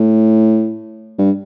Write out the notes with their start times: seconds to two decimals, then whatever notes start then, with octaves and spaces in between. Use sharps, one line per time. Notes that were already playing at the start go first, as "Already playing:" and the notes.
Already playing: A2
1.19 G2